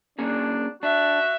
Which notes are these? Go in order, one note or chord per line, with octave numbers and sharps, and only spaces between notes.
A#3 C#4 D4 G#4
D4 F#4 E5